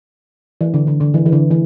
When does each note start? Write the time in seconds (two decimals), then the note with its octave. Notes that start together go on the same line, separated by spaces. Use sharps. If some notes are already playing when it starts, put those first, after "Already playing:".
0.61 E3
0.74 D3
0.87 D3
1.01 D3
1.14 E3
1.26 E3
1.33 D3
1.51 E3